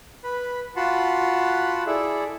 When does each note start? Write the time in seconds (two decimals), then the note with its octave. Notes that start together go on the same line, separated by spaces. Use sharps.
0.24 B4 B5
0.76 F4 F#4 F#5 A5 B5 C6
1.87 E4 G#4 A4 D5 E5